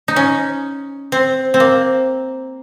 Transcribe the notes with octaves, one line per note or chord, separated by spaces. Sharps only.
D#4
C#4
C4
C4
A#3